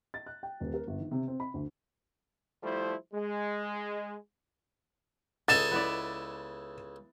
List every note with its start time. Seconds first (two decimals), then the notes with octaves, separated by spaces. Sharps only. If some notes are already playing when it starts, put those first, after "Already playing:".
0.14 A6
0.26 F#6
0.43 G5
0.60 D#1
0.74 A#4
0.87 G1
0.99 D#3
1.11 C3
1.28 C4
1.40 B5
1.54 D2
2.62 F3 G3 A3 E4 C5
3.13 G#3
5.48 C#2 A4 D#5 G#5 A6 E7
5.71 B3 E4 D5